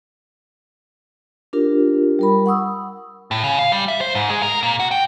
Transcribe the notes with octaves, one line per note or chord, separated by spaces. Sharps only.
D4 F4 G4 A#4
G3 A#4 B5
F#5 C#6 D#6 E6
A2
C#3
F5
G3
E5
C5
G#2
G#3
A#4
A#2
F#4
G5